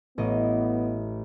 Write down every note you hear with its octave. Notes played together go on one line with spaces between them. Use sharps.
A1 B3 D#5